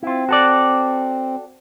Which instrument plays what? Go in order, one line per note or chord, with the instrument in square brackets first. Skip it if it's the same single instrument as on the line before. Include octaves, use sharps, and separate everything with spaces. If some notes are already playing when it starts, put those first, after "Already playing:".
[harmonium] C4 [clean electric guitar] E4 F4
[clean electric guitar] F#4 A4 D5